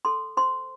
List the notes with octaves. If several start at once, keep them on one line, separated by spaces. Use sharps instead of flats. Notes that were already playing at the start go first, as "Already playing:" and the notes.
A4 C6
C5 C6